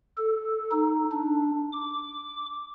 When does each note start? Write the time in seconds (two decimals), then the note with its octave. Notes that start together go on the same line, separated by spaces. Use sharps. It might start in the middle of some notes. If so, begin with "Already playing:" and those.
0.17 A4
0.72 D#4
1.12 D4
1.72 D6